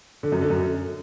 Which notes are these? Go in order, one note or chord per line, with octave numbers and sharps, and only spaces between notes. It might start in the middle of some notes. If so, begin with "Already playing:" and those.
D3
F#2
D3
F#2